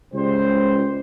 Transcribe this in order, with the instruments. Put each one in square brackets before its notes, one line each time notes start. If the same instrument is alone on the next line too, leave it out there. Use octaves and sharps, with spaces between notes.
[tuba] C#2 [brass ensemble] C#3 G3 C5